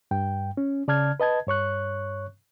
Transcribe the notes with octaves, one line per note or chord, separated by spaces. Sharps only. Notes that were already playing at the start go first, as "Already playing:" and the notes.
G2 G5
C#4
C#3 D5 A5 F6 G#6
B4 D#5 A5 G#6
G2 C#5 C#6 F#6